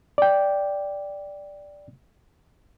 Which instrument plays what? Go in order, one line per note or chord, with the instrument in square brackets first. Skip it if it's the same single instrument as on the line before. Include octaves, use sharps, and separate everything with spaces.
[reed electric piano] D5 G5